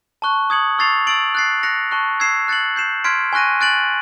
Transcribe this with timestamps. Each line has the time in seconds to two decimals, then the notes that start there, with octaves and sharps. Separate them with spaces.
0.22 A5 C#6 F#6
0.50 D#6 G#6 C#7 F#7
0.78 C#6 E6 A6 C7 F7
1.07 E6 A6 D7 F#7
1.35 F#6 A6 C7
1.63 F#6 A#6 C#7 F7
1.91 A5 C#6 F#6
2.20 E6 G#6 C7 E7
2.48 F#6 A6 C#7 F#7
2.76 G6 C7 E7
3.04 C6 F6 G#6 B6 D7
3.33 G#5 C#6 F#6 A#6 D#7
3.61 F#6 A6 D7 F#7